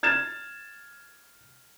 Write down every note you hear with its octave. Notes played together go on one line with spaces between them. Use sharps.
F6 G#6 A6 E7